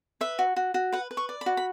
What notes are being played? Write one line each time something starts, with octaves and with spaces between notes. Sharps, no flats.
B4 E5
F#4
F#4
F#4
B4 F#5
B4
C#6
D5
B5
F#4
B5